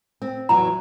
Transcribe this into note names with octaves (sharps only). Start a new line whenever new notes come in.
C4
E2 F#3 A#5